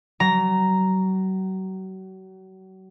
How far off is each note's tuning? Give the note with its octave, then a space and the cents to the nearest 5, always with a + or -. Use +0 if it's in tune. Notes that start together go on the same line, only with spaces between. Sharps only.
F#3 +35 A#5 +0